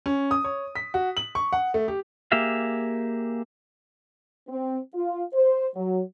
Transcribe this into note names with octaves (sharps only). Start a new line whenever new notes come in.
C#4
D#6
C#5
B6
F#4
F#7
C#6
F#5
A3
G4
A#3 G4 G#4 E5 F5
C4
F4
C5
F#3